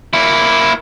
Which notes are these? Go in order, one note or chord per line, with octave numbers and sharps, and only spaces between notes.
A#3 E4